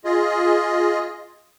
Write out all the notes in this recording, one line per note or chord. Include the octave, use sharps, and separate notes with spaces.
F4 G#4 D#5